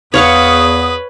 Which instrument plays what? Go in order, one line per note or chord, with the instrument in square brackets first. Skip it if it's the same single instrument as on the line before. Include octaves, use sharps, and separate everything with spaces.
[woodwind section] E2 D#6 [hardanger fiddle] B4 [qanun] C#5 F5 C#6